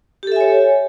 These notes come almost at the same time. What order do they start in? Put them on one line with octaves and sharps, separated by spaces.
G4 A4 E5 G#5 C#5